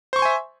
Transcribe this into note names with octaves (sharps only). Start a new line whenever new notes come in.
C5 E5 G#5 C6 C#6